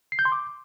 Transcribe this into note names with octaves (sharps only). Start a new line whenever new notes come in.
C7
G6
C6
D6